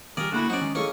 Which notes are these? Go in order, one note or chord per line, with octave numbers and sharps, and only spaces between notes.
A#2 D#3 G3 G#4 A#4 D5
D3 A3 A#3 E4 F#4 B5
F#3 C#4 D#4 C5 D5 F#5
D#3 G#3 C#4
A2 A#3 C#4 D#4 G#4 A4 C#6